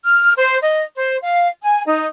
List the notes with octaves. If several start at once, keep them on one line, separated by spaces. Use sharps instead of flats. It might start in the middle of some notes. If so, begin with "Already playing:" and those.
F6
C5
D#5
C5
F5
G#5
D#4